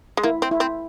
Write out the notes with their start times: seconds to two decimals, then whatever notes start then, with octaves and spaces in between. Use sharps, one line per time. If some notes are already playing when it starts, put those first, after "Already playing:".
0.17 G#3
0.23 A#3 E4
0.42 C4
0.51 E4
0.60 C4